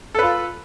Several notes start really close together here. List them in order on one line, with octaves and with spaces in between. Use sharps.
A4 B4 F4